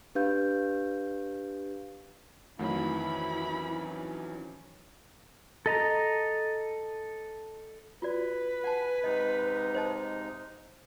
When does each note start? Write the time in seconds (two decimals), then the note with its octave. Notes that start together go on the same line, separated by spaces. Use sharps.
0.15 D4 G4 B4 F5 G6
2.59 F2 D#3 E3 F#3 A3 C#4 E4 B5
5.66 A4 D#5 A#5
8.02 F4 F#4 B4 D5
8.64 F#5 G#5 A5
9.04 G#2 C3 D#4 D#5
9.75 C5 D#5 A5